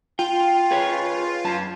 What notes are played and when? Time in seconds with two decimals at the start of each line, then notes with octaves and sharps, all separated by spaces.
0.19 F4 G5
0.71 G#4 B4 C#5
1.45 F#2 A5